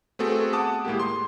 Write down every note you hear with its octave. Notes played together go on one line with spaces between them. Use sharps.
A3 B3 C4 F#4 G#4 A4
F#5 A5 D6 D#6
A2 G#3 A#3 G4
C6